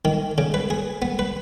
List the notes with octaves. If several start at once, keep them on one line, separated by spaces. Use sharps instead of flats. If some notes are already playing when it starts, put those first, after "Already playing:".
D#3
C#3
B4
G#4
B3
B4